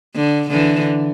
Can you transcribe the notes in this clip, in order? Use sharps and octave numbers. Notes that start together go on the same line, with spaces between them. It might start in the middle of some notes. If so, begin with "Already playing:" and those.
D3
D3 E3